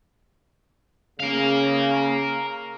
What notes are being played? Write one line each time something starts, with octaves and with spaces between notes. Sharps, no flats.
C#3 A#4 F5